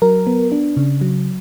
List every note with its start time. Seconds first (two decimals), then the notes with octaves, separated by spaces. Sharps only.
0.02 F#3 A#4
0.27 B3
0.52 D4
0.77 C#3
1.01 F#3